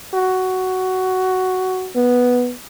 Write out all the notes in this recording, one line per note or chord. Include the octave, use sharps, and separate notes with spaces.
F#4
B3